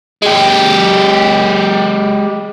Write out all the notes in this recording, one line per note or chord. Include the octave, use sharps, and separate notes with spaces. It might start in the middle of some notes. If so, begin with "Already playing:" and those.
G#3 G4